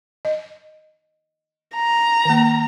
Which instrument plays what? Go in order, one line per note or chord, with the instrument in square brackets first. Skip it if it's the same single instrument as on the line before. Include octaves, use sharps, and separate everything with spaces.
[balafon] D#5
[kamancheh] A#5
[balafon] D#3 A#3